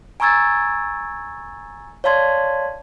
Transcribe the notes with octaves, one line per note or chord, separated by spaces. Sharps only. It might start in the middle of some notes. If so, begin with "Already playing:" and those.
G#5 A#5 C#6 E6 G#6 A6
C#5 D5 F5 A5 C6 G#6